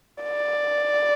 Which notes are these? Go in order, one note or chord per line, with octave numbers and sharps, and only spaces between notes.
D5